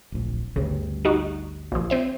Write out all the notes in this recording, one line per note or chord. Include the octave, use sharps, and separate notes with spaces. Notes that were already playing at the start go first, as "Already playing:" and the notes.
D1 A#1
G1 D2 G2 C#3
G3 D#4 F#4
A#1 F3
C4 C5 E5